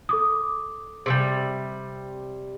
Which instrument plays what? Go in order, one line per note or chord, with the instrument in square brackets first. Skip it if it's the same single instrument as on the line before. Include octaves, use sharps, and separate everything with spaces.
[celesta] A4 D6 D#6
[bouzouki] C3 E3 G3